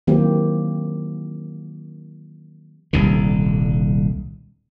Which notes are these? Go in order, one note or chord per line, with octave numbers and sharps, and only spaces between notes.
D#3 E3 F#3 A#3 C4 G4
D#1 C2 D3